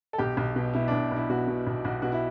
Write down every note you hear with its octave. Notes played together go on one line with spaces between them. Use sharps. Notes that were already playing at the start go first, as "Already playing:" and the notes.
A4
B1 G4
B1
B2
B2 E4
B1 D4
B1 E4
B2 F#4
B2
B1
B1 F#4
B2 F#4
E4